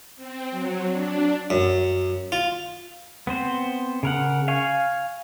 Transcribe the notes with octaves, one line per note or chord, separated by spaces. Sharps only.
C4
F#3
D4
F#2
F4
B3 C4 C5
C#3 A#4 F#5
F5 G#5 C#6